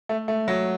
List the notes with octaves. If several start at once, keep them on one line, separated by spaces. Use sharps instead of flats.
A3
A3
F#3